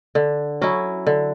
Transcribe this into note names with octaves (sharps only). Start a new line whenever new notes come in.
D3
F#3 C#4 E4
D3